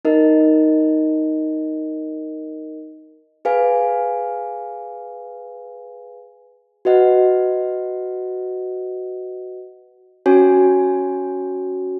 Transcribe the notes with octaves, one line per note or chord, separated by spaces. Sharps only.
D#4 A#4 D#5
G#4 B4 F5 G#5
F#4 B4 D#5 F#5
C#4 F#4 C#5 G#5